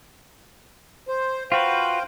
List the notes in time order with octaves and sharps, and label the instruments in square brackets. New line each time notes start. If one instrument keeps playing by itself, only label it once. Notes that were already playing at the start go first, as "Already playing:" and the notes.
[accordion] C5
[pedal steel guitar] F4 F#4 B4 [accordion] C5 F5 G5